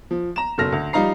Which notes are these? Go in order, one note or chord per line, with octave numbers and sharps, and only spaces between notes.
F3
A#5 E7
F#1 B2 A4 F6 A#6
D2
F3 G3 D#4 F5 A#5 C7